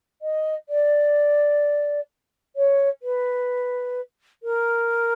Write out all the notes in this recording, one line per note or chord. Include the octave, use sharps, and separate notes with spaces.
D#5
D5
C#5
B4
A#4